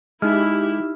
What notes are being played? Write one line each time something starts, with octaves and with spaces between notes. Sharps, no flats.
G#3 D#4 E4 G4 E5 F6